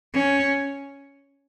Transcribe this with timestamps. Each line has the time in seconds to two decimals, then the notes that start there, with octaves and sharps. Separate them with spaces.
0.14 C#4